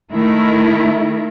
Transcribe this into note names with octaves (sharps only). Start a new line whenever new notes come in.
D#3 A3 E4 A#4